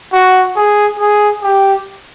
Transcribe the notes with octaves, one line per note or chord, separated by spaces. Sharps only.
F#4
G#4
G#4
G4